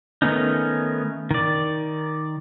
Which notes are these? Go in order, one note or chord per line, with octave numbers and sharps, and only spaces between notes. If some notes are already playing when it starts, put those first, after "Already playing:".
D#3 A3 B3 C#4 D#4
D#3 D5